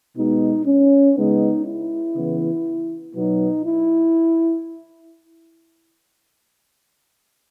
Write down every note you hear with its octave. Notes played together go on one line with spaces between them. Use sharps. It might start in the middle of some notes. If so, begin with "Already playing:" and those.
B2 G#3 B3 D#4
C#4
C#3 G#3 B3 D#4
E4
C#3 E3 B3
B2 F#3 B3 D#4
E4